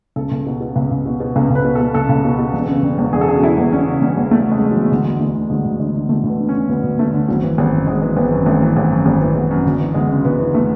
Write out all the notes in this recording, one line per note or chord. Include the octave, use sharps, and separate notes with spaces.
C#2 A4
C#2
B2
B2
C#2
C#2
B2
B2
C#2 A4
C#2
B4
B2
A4
B2
C#2 A4
C#2
B2
B2
E1
C#3
E1
E2
E1 G#4
A4
C#3 G#4
F#4
E1 E4
E2
E1 C#4
C#3
E1 C#4
E2
E1 A3
C#3 G#3
E1
F#3
E2
D2 G#3
D2
D3 A3
D3
D2 G#3
D2
D3 G#3
D3
D2 A3
D2
B3
D3
C#4
D3
D2 B3
D2
D3 A3
D3
G#1 F#3
E3
G#1
F#2
G#1 G#3
E3
G#1 B3
F#2
G#1 A3
E3
G#1
F#2
G#1
E3
G#1
F#2
D2
E3
D2 G#3
C#3
D2 B3
E3
A3